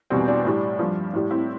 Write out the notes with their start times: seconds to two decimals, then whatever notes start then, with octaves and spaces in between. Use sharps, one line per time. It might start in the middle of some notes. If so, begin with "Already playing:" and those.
0.10 E2 B2 G3 C4
0.28 D4
0.45 A2 G3
0.79 G2 F3
1.13 A2 G3
1.31 C4 E4